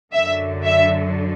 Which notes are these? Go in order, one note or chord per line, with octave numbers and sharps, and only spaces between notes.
F#2 D3 F#3 E5
E5